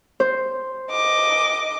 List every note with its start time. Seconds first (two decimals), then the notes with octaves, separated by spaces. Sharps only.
0.20 C5
0.91 D#5 D6